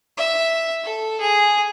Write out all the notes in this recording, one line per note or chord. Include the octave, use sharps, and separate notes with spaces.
E5
A4
G#4